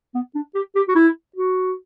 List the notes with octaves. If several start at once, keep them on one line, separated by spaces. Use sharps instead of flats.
B3
D4
G4
G4
F#4
E4
F#4